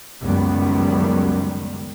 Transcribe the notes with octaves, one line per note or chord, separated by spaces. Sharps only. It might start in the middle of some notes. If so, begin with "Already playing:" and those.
C#2 F#2 D#3 G3 B3